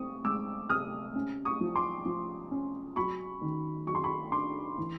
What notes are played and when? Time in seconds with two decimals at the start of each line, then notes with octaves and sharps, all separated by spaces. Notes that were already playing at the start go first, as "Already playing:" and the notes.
Already playing: C3 C4 C#6 D#6
0.25 G#3 D6 E6
0.69 C3 D#6 F6
1.15 C#4
1.45 C#6 D#6
1.61 F3
1.76 C6 D6
2.05 F3
2.51 C#4
2.96 F#3 B5 C#6
3.41 D#3
3.87 F#3 C#6
3.95 C6
4.04 B5 C#6
4.32 D4 C6 D6
4.78 E3